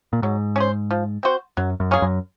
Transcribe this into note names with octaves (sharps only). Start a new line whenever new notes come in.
A#2
G#2 F#3
C#4 G#4 C5
F3
C4 F#4 C5
F#2 F#3
F#2
A#3 C#4 G#4
F#2